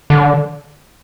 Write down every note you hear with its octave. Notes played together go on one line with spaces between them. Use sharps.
D3